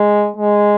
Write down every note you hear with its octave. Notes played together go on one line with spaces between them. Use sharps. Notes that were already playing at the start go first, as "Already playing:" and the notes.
Already playing: G#3
G#3